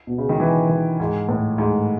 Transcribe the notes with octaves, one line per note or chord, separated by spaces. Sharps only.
B2
C#3
D#3
E3
D#3
G#2
A2
G#2